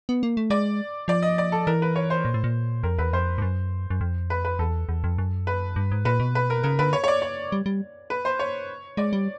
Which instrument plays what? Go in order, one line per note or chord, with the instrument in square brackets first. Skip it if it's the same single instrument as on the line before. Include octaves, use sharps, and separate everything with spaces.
[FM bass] B3
A#3
A3
[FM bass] G#3 [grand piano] D5
[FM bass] F3 [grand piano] D5
[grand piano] D#5
D5
A4
[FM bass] E3 [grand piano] A#4
[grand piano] B4
C#5
C5
[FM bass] A#2
A2
A#2
[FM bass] F2 [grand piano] A#4
[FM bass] E2 [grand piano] B4
[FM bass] F2 [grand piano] C5
[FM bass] G2
F#2
F#2
F2
[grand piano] B4
B4
[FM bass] E2 [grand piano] A4
[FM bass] E2
F2
F#2
[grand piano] B4
[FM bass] G2
G#2
[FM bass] A#2 [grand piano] B4
[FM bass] B2
[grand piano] B4
A#4
[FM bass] C#3 [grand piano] A#4
[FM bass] D3 [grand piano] B4
[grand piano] C#5
C#5
D5
C#5
[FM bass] G3
G3
[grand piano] B4
C5
C#5
[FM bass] G#3 [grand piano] D5
[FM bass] G3